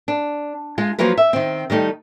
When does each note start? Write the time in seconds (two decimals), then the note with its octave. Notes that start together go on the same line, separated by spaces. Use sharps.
0.08 D4
0.78 G#3 F4
0.99 F3 F#3 A#3 F4 A#4 B4
1.18 E5
1.33 D#3 C4
1.70 D#3 G3 A3 D#4